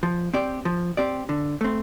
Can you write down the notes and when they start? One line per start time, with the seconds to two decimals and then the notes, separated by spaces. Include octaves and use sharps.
0.03 F3
0.33 C4 G4 D5
0.65 F3
0.97 C4 G4 D5
1.29 D3
1.61 A3 C4